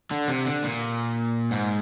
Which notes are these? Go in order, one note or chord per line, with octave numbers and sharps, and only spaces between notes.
D3
C3
D3
A#2
G#2